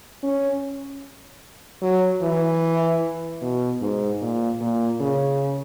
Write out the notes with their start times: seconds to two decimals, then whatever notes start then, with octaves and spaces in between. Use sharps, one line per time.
0.23 C#4
1.82 F#3
2.22 E3
3.42 B2
3.82 G#2
4.21 A#2
4.61 A#2
5.01 C#3